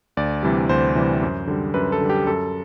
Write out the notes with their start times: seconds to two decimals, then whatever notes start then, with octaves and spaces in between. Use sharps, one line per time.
0.17 D2 D5
0.43 C3 E3 G3
0.69 D2 C5
0.95 C3 E3 G3
1.22 F#2
1.47 D3 G3
1.74 F#2 B4
1.92 A4
2.01 D3 G3
2.10 G4
2.27 F#2 A4